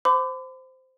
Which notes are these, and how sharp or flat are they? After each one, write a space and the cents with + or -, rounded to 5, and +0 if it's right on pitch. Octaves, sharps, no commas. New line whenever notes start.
C5 -10 B5 +45 D6 +0